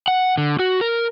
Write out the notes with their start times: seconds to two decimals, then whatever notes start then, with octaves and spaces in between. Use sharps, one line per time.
0.08 F#5
0.38 D3
0.59 F#4
0.81 A#4